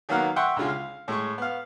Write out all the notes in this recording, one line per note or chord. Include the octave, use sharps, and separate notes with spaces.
D#3 F#3 A#3 B3 F5 F#5
E5 F#5 G5 C6 C#6
C#2 D3 G#3 F4
F5
A2 G#3 C#6
B3 F5